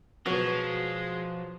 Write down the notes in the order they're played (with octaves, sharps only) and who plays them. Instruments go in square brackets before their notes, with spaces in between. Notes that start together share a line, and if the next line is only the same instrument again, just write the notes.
[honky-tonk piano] B2 F#3 [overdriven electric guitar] F3 [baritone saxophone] G#3 [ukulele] F#4 C#5